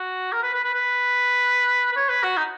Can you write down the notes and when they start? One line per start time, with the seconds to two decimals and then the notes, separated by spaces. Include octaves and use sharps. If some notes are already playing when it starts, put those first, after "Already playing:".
Already playing: F#4
0.32 A#4
0.43 B4
0.53 B4
0.64 B4
0.74 B4
1.92 B4
1.96 C#5
2.09 B4
2.23 F#4
2.37 D#4